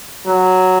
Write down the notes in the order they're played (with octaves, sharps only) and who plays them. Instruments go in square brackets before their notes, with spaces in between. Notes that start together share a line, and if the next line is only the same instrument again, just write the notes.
[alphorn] F#3